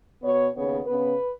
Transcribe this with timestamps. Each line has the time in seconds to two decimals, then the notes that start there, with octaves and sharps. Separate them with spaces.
0.23 B2 B3 C#5
0.55 D#2 C#3 B3 C#5
0.87 C#3 B3 B4